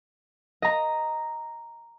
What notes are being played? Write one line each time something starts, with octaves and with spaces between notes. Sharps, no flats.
D#5 A#5